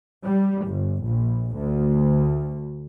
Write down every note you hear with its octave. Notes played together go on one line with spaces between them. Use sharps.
G3
G1
A#1
D2